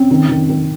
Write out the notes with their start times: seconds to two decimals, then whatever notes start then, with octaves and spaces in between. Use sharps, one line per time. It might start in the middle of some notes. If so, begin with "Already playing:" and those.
Already playing: C4 C#4
0.11 D#3
0.29 D#3
0.49 D#3